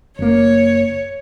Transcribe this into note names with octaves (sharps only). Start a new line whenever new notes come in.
F#1 A#3 C#5